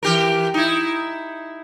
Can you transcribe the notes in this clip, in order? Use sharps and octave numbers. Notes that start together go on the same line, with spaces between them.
E3 G4 A#4
D#4 E4